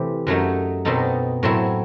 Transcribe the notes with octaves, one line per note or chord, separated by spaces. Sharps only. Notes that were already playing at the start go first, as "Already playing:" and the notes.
Already playing: C3 E3 A3 E4 G4
F#2 F#3 A3 D#4
B2 F#3 C4 D#4 A4
A2 F#3 C4 E4